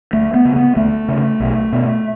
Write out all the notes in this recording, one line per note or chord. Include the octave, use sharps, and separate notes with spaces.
D2 A3
B3
C#3
B3
D2 A3
C#3
B1
B2